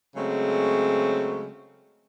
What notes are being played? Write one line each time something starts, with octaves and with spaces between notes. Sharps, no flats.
C#3 F#3 G#3 A3 C4